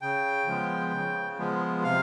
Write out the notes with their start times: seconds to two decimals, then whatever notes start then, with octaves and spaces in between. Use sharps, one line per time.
0.02 C#3 G5
0.47 F3 G#3 B3
0.93 C#3
1.39 F3 G#3 B3
1.84 C3 F5